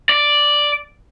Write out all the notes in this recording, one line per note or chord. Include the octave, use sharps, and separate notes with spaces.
D5